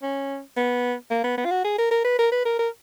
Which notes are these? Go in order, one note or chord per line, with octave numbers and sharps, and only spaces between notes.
C#4
B3
A#3
B3
B3
F4
F#4
G#4
A#4
A#4
B4
A#4
B4
A#4
A#4